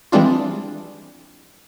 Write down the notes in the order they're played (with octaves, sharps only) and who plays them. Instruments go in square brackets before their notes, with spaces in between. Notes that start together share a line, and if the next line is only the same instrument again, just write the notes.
[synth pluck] E3 G3 G#3 C4 D4 F4